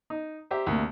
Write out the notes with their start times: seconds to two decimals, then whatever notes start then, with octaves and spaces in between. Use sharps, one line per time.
0.10 D#4
0.51 G4 C5 E5 A#5
0.67 D2 C3 A#3